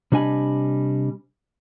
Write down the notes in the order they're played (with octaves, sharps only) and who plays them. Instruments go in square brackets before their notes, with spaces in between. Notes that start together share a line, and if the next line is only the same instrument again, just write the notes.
[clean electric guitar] C3 G3 D4 D#5 G#5 B5